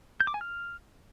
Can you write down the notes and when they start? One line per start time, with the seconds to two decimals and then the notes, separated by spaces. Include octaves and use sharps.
0.20 G6
0.27 D6
0.34 G#5
0.41 F6